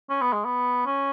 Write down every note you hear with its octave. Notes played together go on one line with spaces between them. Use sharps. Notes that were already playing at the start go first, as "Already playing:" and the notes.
C#4
B3
G#3
B3
C#4